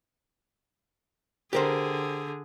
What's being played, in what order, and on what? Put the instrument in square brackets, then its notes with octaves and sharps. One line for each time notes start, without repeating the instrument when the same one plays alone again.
[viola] D3 G#4 [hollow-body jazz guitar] G4 A#4 C5